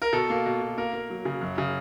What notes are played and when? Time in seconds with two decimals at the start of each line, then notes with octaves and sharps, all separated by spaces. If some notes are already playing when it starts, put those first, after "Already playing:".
0.02 A#4
0.13 B2 A4
0.30 A#3
0.45 B2
0.61 B2
0.77 A#3 A#4
0.93 A#3
1.10 F#3
1.25 C#3
1.41 F#2
1.58 C#3